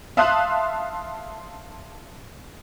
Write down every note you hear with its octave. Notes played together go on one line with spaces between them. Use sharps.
E5 F5 A5 C6 D#6 F#6